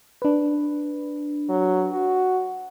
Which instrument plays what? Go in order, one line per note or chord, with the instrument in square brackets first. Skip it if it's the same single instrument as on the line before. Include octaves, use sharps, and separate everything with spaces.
[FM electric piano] D4 B4
[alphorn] F#3
F#4